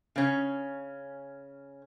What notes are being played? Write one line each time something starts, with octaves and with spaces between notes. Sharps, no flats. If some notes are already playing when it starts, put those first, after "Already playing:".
C#3 C#4